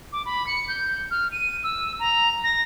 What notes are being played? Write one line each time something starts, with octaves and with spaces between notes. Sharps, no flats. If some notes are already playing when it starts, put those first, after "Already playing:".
D6
B5
C#7
G6
F6
D#7
E6
A#5
A#6